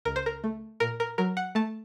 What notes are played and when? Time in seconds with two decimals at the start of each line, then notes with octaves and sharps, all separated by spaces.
0.05 C#2 A#4
0.16 C5
0.26 A#4
0.44 A3
0.80 A#2 A#4
1.00 A#4
1.18 F#3 A#4
1.37 F#5
1.55 A3 A5